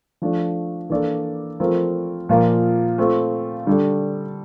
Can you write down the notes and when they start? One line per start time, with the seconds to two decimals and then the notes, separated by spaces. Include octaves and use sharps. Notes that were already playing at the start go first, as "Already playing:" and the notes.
0.22 F3 A3 D4
0.90 E3 A#3 D4 A4 D5
1.60 F3 A3 C4 F4 A#4
2.29 A#2 F3 A#3 F4 A#4
2.98 A3 C4 F4
3.67 D3 G3 D4 A4